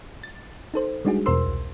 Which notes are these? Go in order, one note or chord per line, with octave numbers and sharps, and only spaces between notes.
A6
D#4 A4 C5
G3 G#3 D4 D#4 F#4 G#4
E2 B2 A#4 C5 C6 E6
C2